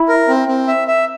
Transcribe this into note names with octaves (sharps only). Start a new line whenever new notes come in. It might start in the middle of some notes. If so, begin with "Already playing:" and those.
Already playing: E4
A#4
C4
C4
E5
E5